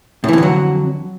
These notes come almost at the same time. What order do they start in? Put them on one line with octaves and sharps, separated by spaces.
A2 E3 F2 D3 F#3